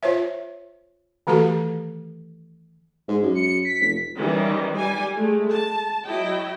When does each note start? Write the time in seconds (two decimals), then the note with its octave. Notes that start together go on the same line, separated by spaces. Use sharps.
0.03 F4 C5 C#5 E5
1.27 D#3 E3 A3 F#4 G4 A4
3.08 G#2
3.23 F#2
3.35 C#7
3.65 B6
3.80 F1
4.17 D#3 E3 G3 C#4
4.75 G3 G#5
5.16 G#3 A3
5.51 A5
6.06 F#3 E4 D#5 G5